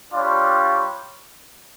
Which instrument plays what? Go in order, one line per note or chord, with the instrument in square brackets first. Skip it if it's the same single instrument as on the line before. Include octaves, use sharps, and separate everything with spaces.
[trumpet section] G3 D4 F4 C#5